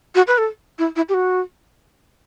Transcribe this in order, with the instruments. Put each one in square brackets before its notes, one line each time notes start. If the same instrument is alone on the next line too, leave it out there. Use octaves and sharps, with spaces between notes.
[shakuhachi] F#4
B4
A4
E4
E4
G4
F#4